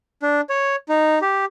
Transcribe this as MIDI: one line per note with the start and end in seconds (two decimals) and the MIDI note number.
0.22 0.41 62
0.49 0.76 73
0.89 1.19 63
1.22 1.45 67